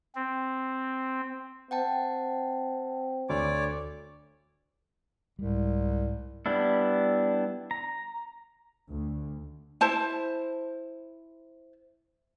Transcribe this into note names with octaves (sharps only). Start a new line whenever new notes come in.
C4
C4 F#5 G5 A5
D2 C#5 D5 D6
C2 G#2 G3
G3 B3 D4 E4
A#5
D2
E4 C5 A5